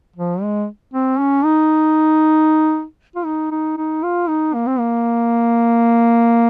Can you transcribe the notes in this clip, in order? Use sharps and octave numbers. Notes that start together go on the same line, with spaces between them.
F3
G#3
C4
C#4
D#4
F4
D#4
D#4
D#4
F4
D#4
A#3
C4
A#3